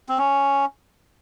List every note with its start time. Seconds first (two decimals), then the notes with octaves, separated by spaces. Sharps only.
0.09 C4
0.18 C#4